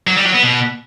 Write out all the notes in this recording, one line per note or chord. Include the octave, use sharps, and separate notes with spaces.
F#3
G3
F#3
B3
B2